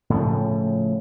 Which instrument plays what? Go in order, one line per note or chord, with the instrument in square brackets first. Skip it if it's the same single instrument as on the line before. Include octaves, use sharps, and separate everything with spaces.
[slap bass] A2 C#3 F3